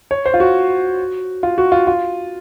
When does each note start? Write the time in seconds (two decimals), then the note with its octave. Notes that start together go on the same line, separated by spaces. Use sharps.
0.11 C#5
0.26 C5
0.34 F4
0.40 F#4
1.43 F4
1.58 F#4
1.72 F4
1.87 F4